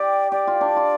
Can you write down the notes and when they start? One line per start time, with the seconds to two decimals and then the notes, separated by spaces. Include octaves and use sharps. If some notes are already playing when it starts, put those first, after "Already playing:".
Already playing: G4 D5
0.32 G4 D5
0.47 F4
0.61 D4
0.76 F4